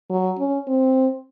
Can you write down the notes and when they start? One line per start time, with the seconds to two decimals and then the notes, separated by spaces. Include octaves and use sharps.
0.10 F#3
0.39 C#4
0.68 C4